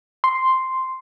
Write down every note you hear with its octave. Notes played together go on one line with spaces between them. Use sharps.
C6